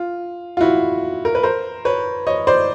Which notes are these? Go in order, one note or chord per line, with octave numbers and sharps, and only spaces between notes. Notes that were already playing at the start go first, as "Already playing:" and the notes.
Already playing: F4
F4
E4 F#4
A#4
B4
A#4 C5
B4 C#5
C#5 D#5
C5 D5